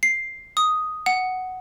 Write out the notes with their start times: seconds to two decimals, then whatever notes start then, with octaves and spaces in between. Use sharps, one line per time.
0.03 C7
0.57 D#6
1.06 F#5